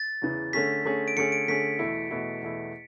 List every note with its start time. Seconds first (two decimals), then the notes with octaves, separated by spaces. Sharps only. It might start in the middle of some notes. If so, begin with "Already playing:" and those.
Already playing: A6
0.22 E2 C#3 E3
0.53 D3 A3 C#4 G#4 B6
0.85 D3 A3 C#4 G#4
1.08 D7
1.17 D3 A3 C#4 G#4 C#7
1.32 D7
1.48 D3 A3 C#4 G#4 B6
1.79 E2 B2 A3 E4
2.11 E2 B2 A3 E4
2.42 E2 B2 A3 E4